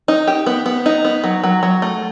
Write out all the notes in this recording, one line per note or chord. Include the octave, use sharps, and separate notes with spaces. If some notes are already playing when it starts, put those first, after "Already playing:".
D#4
G4
B3
B3
D#4
B3
F#3
F#3
F#3
A3